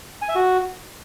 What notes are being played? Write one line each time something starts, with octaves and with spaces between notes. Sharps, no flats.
G#5
E5
F#4